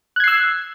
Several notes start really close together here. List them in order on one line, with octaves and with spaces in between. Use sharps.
F#6 G#6 C7 E6